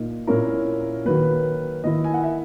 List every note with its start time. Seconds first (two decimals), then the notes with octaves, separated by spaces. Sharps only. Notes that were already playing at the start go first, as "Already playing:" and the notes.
Already playing: A#2 A#3 D#4
0.27 A#2 A#3 C#4 E4 A#4
1.05 D#3 F#3 A#3 B4
1.84 D#3 A#3 E4 D#5
2.04 G#5
2.14 F#5
2.24 E5